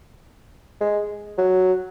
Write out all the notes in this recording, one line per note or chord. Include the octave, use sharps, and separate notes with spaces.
G#3
F#3